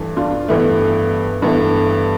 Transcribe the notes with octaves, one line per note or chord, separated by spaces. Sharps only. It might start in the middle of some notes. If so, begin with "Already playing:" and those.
Already playing: G2 E3 A3
D4 F4
G2 E3 A3 B3
G2 E3 A3 B3